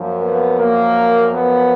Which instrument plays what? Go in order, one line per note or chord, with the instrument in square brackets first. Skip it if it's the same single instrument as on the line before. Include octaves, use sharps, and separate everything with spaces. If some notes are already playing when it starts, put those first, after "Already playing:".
Already playing: [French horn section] F#2 F3 A#3
B3
A#3
B3